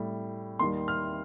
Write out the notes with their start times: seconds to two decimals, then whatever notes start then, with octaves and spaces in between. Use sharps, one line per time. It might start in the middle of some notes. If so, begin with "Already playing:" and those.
Already playing: A2 G3
0.59 D#2 D#3 G3 C6
0.88 F6